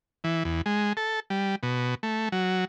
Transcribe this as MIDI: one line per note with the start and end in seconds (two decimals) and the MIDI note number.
0.24 0.43 52
0.45 0.62 40
0.66 0.93 56
0.97 1.20 69
1.30 1.56 55
1.63 1.95 47
2.03 2.29 57
2.32 2.65 54